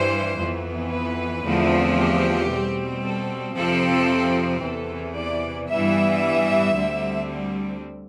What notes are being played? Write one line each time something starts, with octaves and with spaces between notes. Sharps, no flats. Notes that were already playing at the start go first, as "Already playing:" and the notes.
Already playing: G2 E3 G3 C5
F2 E3 B3
B4
E2 D3 F3 A3 C4
G4
B2 G3 C4
A4
F2 C3 F3 C4 A4
E2 C3 E3 A4
D5
G2 E3 G3 B3 E5
D2 D3 G3 C4